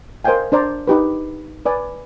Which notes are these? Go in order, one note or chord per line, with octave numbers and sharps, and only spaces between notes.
A#4 C5 D#5 F5 G5 G#5
D4 C5 D5 A#5
D#4 G4 B4
B4 D5 G#5